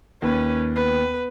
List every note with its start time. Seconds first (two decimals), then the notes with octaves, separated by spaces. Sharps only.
0.22 D#2 C#4 B4
0.74 B3 B4